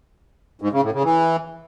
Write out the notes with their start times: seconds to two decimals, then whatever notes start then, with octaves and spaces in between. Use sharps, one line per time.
0.62 G#2
0.72 C#3
0.83 A2
0.93 C#3
1.04 E3